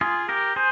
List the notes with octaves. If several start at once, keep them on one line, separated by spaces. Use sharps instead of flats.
F4 G#4
G4 A#4
G#4 C5